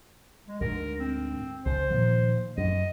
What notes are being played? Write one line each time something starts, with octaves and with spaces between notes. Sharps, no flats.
G#3
D2 G#2 A#4
C4
C#2 C5
A#2 D#3 F3
F#2 D#5